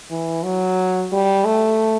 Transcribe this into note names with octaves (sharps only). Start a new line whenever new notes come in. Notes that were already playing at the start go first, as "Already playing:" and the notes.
E3
F#3
G3
A3